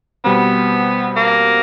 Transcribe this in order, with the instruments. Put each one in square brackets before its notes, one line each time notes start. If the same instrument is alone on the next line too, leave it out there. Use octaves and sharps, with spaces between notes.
[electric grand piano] B2 G3 C4 [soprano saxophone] B3
[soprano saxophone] A#3